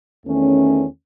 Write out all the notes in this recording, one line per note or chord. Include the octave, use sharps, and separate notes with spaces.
E2 D#3 A3 C#4